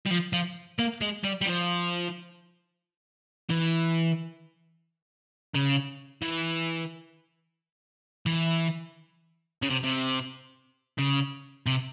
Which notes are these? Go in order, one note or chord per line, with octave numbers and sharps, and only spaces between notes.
G3
F3
F3
A#3
G#3
G3
G3
F3
E3
C#3
E3
E3
C#3
C3
C3
C#3
C3